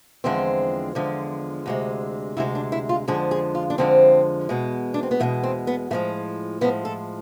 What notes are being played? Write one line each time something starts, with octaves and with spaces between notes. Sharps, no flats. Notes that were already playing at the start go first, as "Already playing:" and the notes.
E2 D3 F3 G#3 C4
E2 D3 F3 G#3
D2 C3 G#3
D2 C3 G#3 E4
D4
E4
F4
F2 D3 F3 G#3 G#4
G#4
F4
D4
F2 D3 F3 G#3 C4
E2 B2 G#3
D4
C4
B3
E2 B2 G#3 A3
C4
B3
A2 F3 G#3 A3
A2 F3 G#3 B3
A4